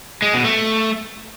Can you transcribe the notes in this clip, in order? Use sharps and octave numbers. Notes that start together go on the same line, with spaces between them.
G#3
B2
A3